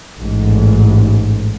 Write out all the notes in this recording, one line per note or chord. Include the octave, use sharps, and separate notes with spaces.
A1 G#2